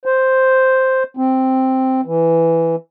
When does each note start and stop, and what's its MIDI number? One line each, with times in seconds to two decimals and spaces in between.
0.06 1.03 72
1.17 2.01 60
2.06 2.76 52